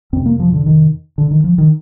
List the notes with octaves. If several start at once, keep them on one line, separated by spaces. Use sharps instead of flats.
F2 C3 C4
A#3
F3
D3
D#3
D3
D#3
F3
D#3